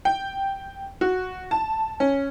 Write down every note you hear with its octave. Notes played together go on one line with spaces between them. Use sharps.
G5
F#4
A5
C#4